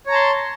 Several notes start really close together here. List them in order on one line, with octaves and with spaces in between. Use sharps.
C#5 A#5 A5 C6